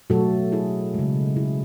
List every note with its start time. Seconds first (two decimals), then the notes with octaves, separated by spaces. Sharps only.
0.10 B2 F#3 A3 F#4 A4
0.52 E4 G#4
0.94 C#3 G#3
1.36 E4 G#4